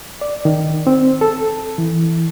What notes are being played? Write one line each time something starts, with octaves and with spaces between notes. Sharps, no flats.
D5
D#3
C4
A4
E3